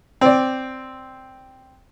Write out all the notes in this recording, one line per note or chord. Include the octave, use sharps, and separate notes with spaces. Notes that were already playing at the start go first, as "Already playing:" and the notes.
C4 D5